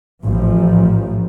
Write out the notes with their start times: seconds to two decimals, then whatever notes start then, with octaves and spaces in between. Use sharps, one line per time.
0.24 A1 F3